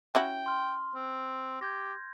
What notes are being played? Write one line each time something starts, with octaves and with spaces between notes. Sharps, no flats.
C#4 E4 F#4 G5
C6 F6
C4
G4 G6 G#6 A#6